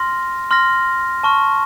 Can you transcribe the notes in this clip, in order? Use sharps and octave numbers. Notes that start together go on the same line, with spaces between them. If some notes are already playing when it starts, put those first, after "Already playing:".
Already playing: C6 F6 A#6
C6 F6 A#6
A5 C#6 F6